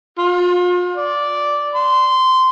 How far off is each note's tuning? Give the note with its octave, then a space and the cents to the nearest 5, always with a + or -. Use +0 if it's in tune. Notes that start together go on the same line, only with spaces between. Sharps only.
F4 +35
D5 -5
C6 -15